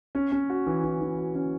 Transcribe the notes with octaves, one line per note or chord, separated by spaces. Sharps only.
C#4
C#4
F#4
E3
E3
E3
F#4
C#4